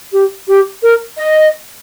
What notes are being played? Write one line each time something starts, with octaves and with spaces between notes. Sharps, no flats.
G4
G4
A#4
D#5